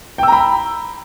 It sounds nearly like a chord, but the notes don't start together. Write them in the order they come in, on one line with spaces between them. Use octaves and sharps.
G5 E6 A#5 B5